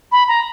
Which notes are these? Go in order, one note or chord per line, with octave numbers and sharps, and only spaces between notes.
B5
A#5